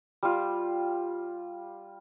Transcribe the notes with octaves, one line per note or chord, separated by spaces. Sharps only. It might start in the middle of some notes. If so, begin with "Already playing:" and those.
G3 F4